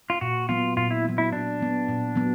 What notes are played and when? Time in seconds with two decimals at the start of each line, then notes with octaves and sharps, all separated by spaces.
0.10 F4
0.21 A#2 F#4
0.49 F#3 B3 F4
0.77 A#2 F4
0.91 E4
1.05 F#3 B3
1.18 E4
1.32 A#2 D4
1.60 F#3 B3
1.89 A#2
2.16 F#3 B3